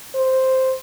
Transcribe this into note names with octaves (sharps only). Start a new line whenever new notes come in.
C5